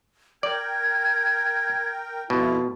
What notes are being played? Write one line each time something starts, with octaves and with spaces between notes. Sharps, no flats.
A#4 D5 G5 G#6
F2 B2 E4 F4